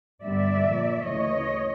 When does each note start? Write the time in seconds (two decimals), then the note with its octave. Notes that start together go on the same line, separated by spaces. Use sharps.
0.23 G2 D3 G3 B3 D5 E5
0.65 A#2 F3 A#3
1.05 D2 C#3 E3 A3 C#5 D#5